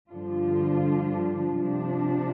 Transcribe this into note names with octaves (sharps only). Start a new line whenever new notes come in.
G2 D3 F3 D4 F4
C3 F3 D4